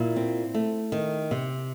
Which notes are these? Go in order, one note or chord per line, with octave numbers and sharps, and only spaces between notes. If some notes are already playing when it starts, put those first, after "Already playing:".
Already playing: A#2 E4
C4
A3
D#3
C3